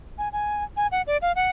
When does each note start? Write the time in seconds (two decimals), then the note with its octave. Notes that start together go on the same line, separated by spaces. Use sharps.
0.18 G#5
0.33 G#5
0.77 G#5
0.92 F#5
1.07 D5
1.22 F5
1.36 F#5